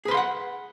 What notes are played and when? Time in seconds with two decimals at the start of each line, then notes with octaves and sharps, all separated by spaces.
0.05 G#4
0.08 B4
0.11 C6
0.14 F5
0.17 F#5